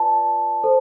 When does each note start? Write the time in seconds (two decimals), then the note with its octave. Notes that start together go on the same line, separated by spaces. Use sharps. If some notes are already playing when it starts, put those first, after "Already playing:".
Already playing: F4 B4 D5 A5
0.63 A4 C5